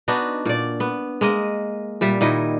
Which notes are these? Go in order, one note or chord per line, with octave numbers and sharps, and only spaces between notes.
B3 D4 D#4 F#4
A#2 D5
B3
G#3 A#3 D#5
A#2 G3 E5
A#2 D#3 E4 D#5